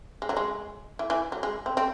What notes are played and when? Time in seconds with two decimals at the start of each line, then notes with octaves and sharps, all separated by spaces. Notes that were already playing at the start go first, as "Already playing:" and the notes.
0.22 G#3
0.29 F#3
0.37 G#3
0.99 E3
1.10 E3
1.32 F#3
1.43 G#3
1.66 C4
1.77 C4